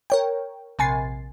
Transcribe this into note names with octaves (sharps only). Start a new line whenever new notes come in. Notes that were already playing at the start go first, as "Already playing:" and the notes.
A#4 C#5 G5
A#1 C3 G#5 A6 C7